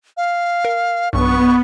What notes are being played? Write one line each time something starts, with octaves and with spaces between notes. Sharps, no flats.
F5
A#4
B1 G2 B3 C#6